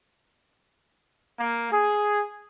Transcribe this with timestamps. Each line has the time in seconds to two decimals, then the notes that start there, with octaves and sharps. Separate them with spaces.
1.39 A#3
1.71 G#4